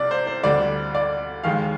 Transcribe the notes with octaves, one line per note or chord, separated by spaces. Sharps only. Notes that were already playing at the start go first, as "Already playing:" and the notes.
Already playing: C2 C3 D5
C5
C5
D2 D3 G3 D5
D5
D#2 D#3 G#3 F5